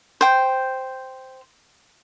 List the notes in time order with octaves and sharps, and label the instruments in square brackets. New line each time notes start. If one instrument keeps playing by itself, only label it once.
[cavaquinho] C5 G5